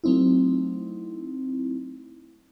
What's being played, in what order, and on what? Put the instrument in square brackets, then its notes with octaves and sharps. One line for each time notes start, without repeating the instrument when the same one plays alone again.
[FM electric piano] F#3 A3 C4 D#4 E4